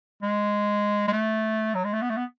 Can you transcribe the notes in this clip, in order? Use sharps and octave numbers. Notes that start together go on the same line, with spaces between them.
G#3
G#3
A3
F#3
G#3
A3
B3
A3
B3